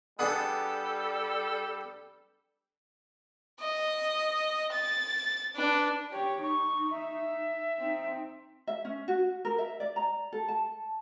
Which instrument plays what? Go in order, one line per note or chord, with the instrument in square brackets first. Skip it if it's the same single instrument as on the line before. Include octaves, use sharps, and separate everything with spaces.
[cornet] G3 [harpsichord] B3 D4 G#4 [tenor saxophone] A4
[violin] D#5
A6
D4 B4
[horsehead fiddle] G4 [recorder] C#5
[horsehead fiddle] D#4 [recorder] C#6
[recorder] E5
[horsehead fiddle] C4 D#4
[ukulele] E5
C#4
F#4
A#4
E5
D5
A#5
A4
A5